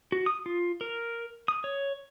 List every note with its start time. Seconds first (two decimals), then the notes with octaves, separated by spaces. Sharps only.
0.12 F#4
0.26 D#6
0.46 F4
0.81 A#4
1.48 D#6
1.64 C#5